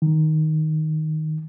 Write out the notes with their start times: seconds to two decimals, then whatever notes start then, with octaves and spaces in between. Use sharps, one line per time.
0.02 D#3